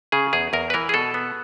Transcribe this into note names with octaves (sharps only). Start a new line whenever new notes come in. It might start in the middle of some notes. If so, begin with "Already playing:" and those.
C#3 G#4
E2 G#4
E2 A#4
B4
E3 A#4
G#4
B2 A4
B3